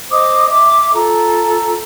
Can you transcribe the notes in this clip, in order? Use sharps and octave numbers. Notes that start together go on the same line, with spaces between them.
C5 D#5 D6 D#6
E5 D6
F4 A4 A#5